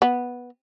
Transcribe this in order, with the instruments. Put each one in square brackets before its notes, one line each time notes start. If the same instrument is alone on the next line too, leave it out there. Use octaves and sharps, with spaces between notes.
[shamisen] B3